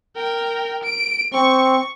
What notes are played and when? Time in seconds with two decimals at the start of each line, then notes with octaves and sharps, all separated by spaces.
0.16 A#4 G5
0.83 D7
1.34 C4 C#6